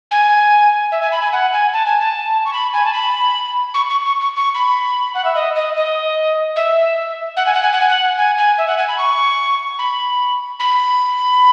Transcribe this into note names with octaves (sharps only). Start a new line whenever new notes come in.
G#5
E5
G#5
B5
G#5
F#5
G#5
A5
G#5
A5
C#6
B5
G#5
A5
B5
C#6
C#6
C#6
C#6
C#6
B5
F#5
E5
D#5
D#5
D#5
E5
F#5
G#5
F#5
G#5
F#5
G#5
F#5
G#5
G#5
E5
F#5
G#5
B5
C#6
B5
B5